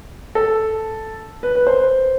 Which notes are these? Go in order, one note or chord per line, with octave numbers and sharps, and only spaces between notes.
A4
B4
B4
C5